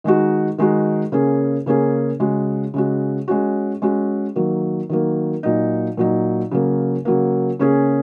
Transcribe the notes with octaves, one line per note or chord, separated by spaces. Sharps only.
D#3 G#3 D#4 F#4
D#3 G#3 D#4 F#4
C#3 A#3 C#4 G#4
C#3 A#3 C#4 G#4
C#3 G#3 F#4
C#3 G#3 F#4
G#3 C#4 F#4
G#3 C#4 F#4
D#3 F#3 A#3
D#3 F#3 A#3
A#2 F#3 D#4
A#2 F#3 D#4
C#3 F#3 A#3
C#3 F#3 A#3
C#3 A#3 C#4 G#4